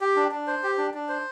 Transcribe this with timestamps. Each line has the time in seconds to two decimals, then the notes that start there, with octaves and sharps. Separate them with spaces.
0.01 G4
0.16 D4
0.31 D4
0.47 C5
0.63 G4
0.78 D4
0.94 D4
1.09 C5